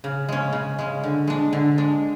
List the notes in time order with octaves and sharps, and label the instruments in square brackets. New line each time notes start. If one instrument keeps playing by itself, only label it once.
[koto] C#3
G#3 C#4
C#3
G#3 C#4
D3
G#3 D4
D3
G#3 D4